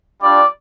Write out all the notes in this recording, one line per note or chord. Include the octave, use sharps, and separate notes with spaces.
G3 D4 F4 D5